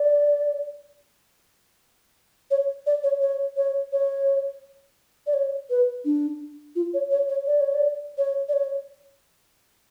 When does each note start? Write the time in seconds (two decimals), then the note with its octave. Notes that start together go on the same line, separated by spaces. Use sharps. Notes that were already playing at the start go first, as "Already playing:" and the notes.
Already playing: D5
2.51 C#5
2.86 D5
3.03 C#5
3.21 C#5
3.57 C#5
3.92 C#5
5.27 D5
5.34 C#5
5.70 B4
6.05 D4
6.75 F4
6.94 C#5
7.11 C#5
7.29 C#5
7.47 D5
7.60 C#5
7.74 D5
8.18 C#5
8.48 D5
8.53 C#5